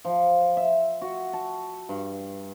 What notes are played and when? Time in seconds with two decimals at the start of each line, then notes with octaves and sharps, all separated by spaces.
0.05 F3
0.57 E5
1.01 F#4
1.33 A5
1.89 G2